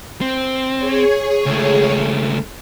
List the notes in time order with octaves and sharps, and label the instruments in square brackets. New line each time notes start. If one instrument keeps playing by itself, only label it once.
[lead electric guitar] C4
[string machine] G#4 C#5
[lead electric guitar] C#2 A3